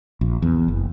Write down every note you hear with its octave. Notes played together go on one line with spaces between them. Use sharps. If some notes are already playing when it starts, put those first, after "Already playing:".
A#1
E2
F#1